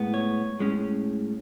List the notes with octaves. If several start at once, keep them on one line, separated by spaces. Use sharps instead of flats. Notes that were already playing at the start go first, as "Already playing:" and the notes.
Already playing: A2 G#3 B3
C#5
A2 G#3 C#4